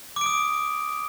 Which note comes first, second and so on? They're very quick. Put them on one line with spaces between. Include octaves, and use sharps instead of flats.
D6 D7 D#6